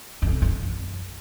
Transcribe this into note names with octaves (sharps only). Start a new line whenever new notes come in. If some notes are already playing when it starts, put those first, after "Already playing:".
E2
C3
G#2
F2
F#2